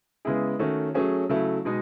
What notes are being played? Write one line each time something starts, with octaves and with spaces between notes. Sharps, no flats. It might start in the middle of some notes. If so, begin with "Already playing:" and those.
C#3 G#3 B3 E4 G#4
D#3 A3 C#4 F#4
F#3 A3 C#4 G#4
C#3 F#3 A3 E4
B2 G#3 D#4